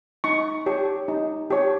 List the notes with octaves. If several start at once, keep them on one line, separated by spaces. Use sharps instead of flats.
D#4 C#6
G4 C#5
D#4
G4 C#5